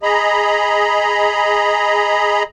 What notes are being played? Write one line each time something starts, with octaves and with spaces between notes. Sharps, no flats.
G#4 D#5 A#5 B5